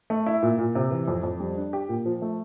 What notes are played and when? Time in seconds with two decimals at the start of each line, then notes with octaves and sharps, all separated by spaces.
0.10 A3
0.26 E4
0.43 A#2
0.59 A#2
0.75 C3
0.91 E3
1.08 F2
1.23 F2
1.40 G3
1.56 D4
1.73 G4
1.89 A#2
2.06 F3
2.22 A3